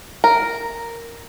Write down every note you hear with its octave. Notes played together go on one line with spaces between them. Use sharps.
A#4